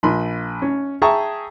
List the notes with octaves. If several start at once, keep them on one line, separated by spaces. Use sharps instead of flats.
A#1 B5 C6
C#4
G#4 E5 G5 A5 A#5 C#6